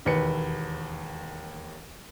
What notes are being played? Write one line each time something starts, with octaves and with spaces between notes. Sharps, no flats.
E1 D#2 B4 C#7